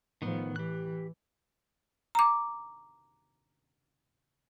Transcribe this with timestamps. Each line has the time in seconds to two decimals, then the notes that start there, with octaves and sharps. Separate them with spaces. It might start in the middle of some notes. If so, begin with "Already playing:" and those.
0.22 A2 D#3 F3 B3
0.56 E3 G4 F#6
2.15 A#5 D6